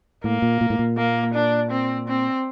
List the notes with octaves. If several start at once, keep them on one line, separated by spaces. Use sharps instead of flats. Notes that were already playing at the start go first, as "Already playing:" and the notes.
A2 A#3
A#2
A#2
A2
A#2
A#3
D4
C4
C4